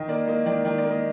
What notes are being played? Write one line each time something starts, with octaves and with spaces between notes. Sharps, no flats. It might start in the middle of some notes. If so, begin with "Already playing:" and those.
Already playing: D#3 D#5
A#3 D5
A#3 D#5
D#3 D5
D#3 D5
D5
A#3
D#5